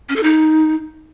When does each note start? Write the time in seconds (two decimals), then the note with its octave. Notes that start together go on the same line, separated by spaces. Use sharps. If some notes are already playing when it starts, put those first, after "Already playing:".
0.09 C#4
0.16 A4
0.23 D#4